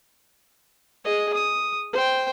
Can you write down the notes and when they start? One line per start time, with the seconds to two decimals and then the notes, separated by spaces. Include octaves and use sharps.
1.04 G#4 D#5
1.34 D#6
1.93 C5 G5